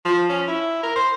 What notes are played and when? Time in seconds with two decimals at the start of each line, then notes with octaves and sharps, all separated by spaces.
0.05 F3
0.29 C#4
0.48 E4
0.83 A#4
0.96 C5